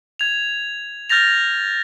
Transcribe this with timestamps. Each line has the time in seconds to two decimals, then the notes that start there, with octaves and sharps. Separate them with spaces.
0.19 G#6 F7
1.10 F6 G6 A6 A#6 F7